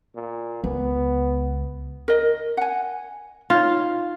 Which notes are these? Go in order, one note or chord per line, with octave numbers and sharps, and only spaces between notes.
A#2
C#2 B3
A#4 D#5
F#5 G#5
D#4 F4 C#5